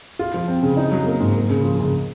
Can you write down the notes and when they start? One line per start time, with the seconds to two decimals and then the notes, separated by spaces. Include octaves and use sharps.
0.19 F4
0.34 F3
0.48 C4
0.63 C#3
0.77 D#4
0.92 F#3
1.06 A#3
1.20 G#2
1.35 A#3
1.50 C#3
1.64 F3
1.79 C#2